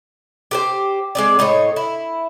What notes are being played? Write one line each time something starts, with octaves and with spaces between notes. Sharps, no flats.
G4 B4 C5
G#3 C4 D5
A2 D#4 C5 C#5
E4